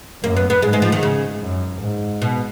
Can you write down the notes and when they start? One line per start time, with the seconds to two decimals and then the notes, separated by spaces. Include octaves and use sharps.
0.23 F#2 A#3
0.37 B3
0.50 B3
0.62 G#2 G#3
0.73 G#3
0.82 F3
0.92 D#3
1.03 C#3
1.42 F#2
1.81 G#2
2.22 B2